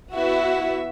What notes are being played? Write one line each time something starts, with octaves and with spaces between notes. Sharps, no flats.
B3 E4 F#4 E5